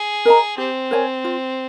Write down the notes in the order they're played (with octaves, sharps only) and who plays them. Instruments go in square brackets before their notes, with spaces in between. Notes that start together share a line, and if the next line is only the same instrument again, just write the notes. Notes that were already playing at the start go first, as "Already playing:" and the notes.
Already playing: [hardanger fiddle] G#4
[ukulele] A#4 D#5 A#5
[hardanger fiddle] C4 [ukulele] G4
[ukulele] A#4 C#5 G#5
F4